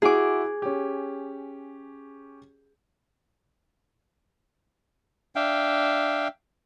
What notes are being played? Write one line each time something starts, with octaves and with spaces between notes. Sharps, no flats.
E4 F#4 G#4 D6
C#4 G4
D4 E5 F5 G5